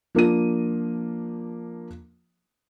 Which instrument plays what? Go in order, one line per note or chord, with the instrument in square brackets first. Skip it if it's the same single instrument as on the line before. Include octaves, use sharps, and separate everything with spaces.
[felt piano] F3 A#3 D4 D#7